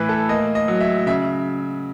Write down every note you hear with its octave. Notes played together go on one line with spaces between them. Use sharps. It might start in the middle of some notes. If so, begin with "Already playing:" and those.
Already playing: A2 E3 B4
A4
A#3 D#5
D#5
F#3
E5
C#3 E5